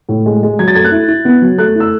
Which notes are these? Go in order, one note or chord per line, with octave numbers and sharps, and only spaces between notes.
A2
G#3
G#3
F#3 G#6
A6
A3 G#6
F#6
E4
E4
B3
F#3
A3 F#6
E4 E6